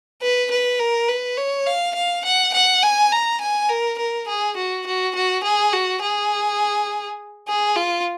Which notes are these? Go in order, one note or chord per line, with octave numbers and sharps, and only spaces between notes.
B4
B4
A#4
B4
C#5
F5
F5
F#5
F#5
G#5
A#5
G#5
A#4
A#4
G#4
F#4
F#4
F#4
G#4
F#4
G#4
G#4
F4